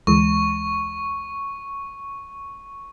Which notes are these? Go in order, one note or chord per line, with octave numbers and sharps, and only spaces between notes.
D2 E3 G#3 C#6